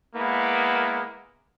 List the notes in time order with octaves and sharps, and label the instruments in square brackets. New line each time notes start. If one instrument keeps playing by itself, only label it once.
[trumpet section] G#3 A#3 B3 E4